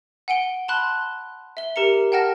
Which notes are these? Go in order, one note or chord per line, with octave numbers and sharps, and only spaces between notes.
F#5 G#5 D7 G7
A5 B5 C6 F#6
E5 G7
G4 A#4 A#5 C#7
F#5 G5 A5 F6 A#6